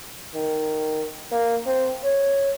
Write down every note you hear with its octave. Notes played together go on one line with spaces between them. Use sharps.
D#3
A#3
C4
C#5